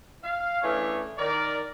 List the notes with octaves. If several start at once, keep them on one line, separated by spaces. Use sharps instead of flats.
F5
E3 A3 C#4 D4 G#4 C#5
D#3 A#4 D5